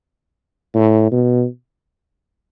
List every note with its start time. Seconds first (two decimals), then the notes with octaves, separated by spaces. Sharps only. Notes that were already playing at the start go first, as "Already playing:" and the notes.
0.75 A2
1.12 B2